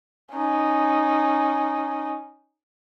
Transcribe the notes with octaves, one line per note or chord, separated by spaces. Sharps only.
C#4 D#4